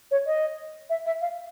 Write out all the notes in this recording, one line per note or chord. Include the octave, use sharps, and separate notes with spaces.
C#5
D#5
E5
E5
F5